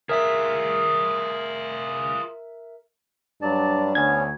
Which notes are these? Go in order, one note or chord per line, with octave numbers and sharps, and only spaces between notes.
F4 G#4 A#4 E5 B6
G2 F#3 D4 D5 A5
D2 B3 C#4 G#6